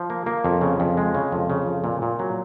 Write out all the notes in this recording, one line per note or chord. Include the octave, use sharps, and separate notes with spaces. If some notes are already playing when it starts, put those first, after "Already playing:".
Already playing: F3
A#3
A#3
F2
C#3
F2
G#3
C#3
F2
C#3
F2
A#2
A#2
F#3